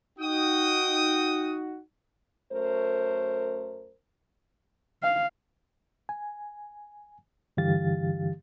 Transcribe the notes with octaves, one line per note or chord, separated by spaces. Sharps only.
D#4 F#4 G5 D#6
F#2 A3 A#4 C5
F5
G#5
G2 D3 E3 G4 F5 A6